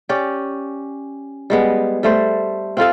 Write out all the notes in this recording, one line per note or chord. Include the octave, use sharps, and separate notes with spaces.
C#4 G4 D5
G3 G#3 B3
G3 A3 C5
C4 F4 A4 F5